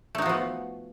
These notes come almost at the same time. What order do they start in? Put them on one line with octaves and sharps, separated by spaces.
A3 D#4 F#4 F3 B3